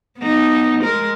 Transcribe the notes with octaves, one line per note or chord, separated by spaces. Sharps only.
B3 D#4
G#3 A#4